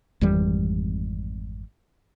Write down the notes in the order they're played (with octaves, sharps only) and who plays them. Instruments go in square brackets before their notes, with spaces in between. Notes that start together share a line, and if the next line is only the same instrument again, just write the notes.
[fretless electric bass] G#1 F2 E3 G3